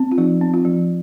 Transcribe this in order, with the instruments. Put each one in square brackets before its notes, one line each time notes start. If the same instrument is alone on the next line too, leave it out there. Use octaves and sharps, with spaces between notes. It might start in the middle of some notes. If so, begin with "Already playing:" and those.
Already playing: [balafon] C4
F4
F3 D#4
C4
F4
F3